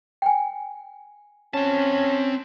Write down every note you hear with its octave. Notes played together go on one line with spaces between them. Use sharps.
G5 G#5
C4 C#4 A5